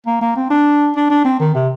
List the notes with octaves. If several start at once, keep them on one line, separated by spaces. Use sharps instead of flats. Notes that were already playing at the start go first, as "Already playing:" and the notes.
A#3
A#3
C4
D4
D4
D4
C4
D#3
C3